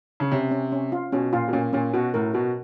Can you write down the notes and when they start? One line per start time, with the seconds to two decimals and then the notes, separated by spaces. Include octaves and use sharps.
0.20 C#3
0.31 C3 C#4
0.51 C#4
0.72 C#4
0.92 F4
1.12 B2 C#4
1.33 A#2 F4
1.48 B2
1.53 A#2 C#4
1.73 A#2 C#4
1.93 B2 F#4
2.14 A2 A#4
2.34 B2 F#4